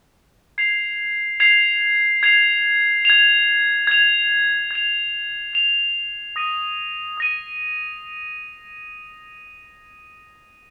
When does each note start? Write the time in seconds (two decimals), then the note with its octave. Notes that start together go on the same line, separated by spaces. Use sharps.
0.58 G#6 C7 F7
1.40 G#6 C7 F7
2.23 G#6 C7 F7
3.05 G#6 F7
3.87 G#6 F7
4.71 G#6 F7
5.53 G#6 F7
6.36 D#6 A#6 D#7
7.17 D#6 A#6 D#7